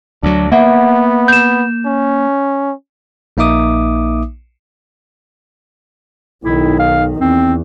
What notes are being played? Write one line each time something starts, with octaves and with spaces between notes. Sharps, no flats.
D2 F#3 D4
A#3 B3 E5 F#5
G6 E7
C#4
A#1 A#3 D#4 E5 D6 D#6
B1 D#3 E4
F5
E2 C4